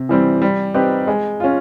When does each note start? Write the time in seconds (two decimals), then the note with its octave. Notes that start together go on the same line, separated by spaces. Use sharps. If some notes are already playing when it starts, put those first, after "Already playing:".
Already playing: C3
0.09 E3 G3 C4
0.42 G3
0.74 C4 D#4 G4 B4
1.07 G#3
1.40 C#4 F4